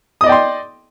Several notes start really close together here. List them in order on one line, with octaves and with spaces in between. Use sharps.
D#6 D#5 D5 G5 C6